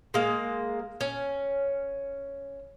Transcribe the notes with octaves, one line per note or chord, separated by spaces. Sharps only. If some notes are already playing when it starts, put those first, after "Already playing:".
G#3 A#3
C#4